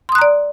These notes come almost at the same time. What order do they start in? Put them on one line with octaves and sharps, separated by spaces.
C6 D#6 F#6 A#5 D5